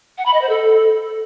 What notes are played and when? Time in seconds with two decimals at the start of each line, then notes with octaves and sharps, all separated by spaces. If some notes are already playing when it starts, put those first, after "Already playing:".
0.18 F#5
0.26 B5
0.33 D#5
0.41 C5
0.49 A4